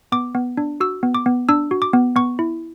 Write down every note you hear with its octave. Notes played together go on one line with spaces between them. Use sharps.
B3 D6
B3
D4
F#4 E6
B3
D6
B3
D4 E6
F#4
D6
B3
B3 C#6
E4